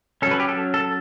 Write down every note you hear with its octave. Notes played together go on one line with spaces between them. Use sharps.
F#3 C#4 A4 B4
G4
A4
A4